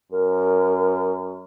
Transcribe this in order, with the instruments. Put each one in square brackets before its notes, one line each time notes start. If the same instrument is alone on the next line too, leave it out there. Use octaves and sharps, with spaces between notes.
[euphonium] F#2 [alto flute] A#4